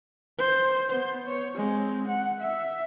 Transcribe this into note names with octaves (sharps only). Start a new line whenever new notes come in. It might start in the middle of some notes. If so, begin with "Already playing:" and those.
C5
B3 C5
C#5
G#3 C4
F#5
E5